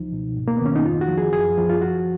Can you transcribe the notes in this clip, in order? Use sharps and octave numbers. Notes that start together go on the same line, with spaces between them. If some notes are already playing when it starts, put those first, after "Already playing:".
Already playing: C#2 F3 D#4
B2
G#2
A#3
D#3 B3
C#4
D#4
F2 F4
F#4
F3
G#4
F#2 G#4
F3
F4
F3 F#4